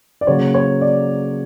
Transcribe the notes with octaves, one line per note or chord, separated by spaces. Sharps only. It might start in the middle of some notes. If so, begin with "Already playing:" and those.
D5
C#3 F#3 A#3 C#5
C#5
D5